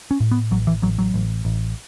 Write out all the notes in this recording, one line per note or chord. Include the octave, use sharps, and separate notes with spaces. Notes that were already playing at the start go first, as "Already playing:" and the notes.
C#4
A2
B3
A1 F#3
E3
A1 F#3
F#3
A1
A1